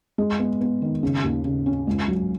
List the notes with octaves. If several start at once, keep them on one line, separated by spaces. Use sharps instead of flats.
G#3
B3
B3
D#3
C#3
D#2
C#3
C#4
C#2
F#3